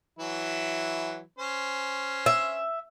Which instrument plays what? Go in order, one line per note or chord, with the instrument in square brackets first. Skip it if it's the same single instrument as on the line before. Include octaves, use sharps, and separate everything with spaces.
[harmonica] E3 F#3 E4
C#4 C5
[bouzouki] E5